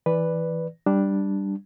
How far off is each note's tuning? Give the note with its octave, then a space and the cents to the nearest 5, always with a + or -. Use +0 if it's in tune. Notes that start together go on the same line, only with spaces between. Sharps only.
E3 -10 B4 +0 D5 +0
G3 +0 D4 +0